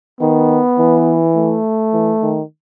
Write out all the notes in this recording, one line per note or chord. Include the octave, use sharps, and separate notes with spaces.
D#3 B3
E3
A3
E3
D#3